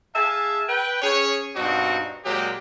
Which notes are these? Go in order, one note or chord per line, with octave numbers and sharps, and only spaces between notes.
G#4 E5 F5 G#5 A5
B4 G5
C#4 G#4 C#5
G2 B2 C4 D#4 F#4
A#2 F#3 G#3 A#3 G4